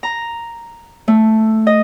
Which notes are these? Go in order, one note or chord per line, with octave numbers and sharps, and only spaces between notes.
A#5
A3
D#5